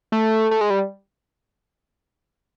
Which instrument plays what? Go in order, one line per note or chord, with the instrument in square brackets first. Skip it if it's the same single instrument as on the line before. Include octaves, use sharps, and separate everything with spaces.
[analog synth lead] A3
A3
G#3
G3